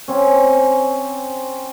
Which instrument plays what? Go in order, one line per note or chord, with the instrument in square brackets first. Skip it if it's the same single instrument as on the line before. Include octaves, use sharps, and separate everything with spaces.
[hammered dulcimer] C4 C#4